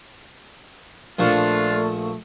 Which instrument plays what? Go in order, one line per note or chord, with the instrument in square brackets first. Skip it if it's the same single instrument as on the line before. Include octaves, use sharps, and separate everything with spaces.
[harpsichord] A#1 F3 C#6 [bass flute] A3 [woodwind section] D4 F4